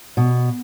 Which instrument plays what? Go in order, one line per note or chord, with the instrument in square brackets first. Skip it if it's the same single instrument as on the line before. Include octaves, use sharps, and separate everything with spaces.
[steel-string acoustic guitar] B2